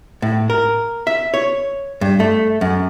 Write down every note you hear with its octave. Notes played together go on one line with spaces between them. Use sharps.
A2
A#4
E5
C#5
G2
A3
F#2